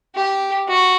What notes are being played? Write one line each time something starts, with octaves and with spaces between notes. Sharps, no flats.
G4
F#4